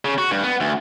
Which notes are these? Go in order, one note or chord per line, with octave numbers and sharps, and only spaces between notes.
C#3
F#4
G2
B3
D2